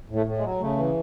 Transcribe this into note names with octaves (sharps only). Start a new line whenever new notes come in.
A2
A3
A2
G#3
F#3
C#3 A3
E3